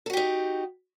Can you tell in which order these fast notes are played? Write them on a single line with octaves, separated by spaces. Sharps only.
A4 F#4 G4 D#4